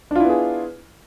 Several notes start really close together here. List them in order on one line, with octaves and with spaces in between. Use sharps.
D4 F4 E4 B3 G#4